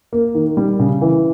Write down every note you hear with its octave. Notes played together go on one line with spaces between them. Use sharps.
A#3
D#3
G3
C#3
E3